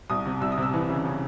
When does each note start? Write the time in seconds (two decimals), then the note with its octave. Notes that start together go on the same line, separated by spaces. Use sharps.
0.10 C2 D#6
0.25 C3
0.41 C2 E6
0.52 D#6
0.57 C3
0.63 E6
0.73 E3
0.89 C#3
1.05 C#3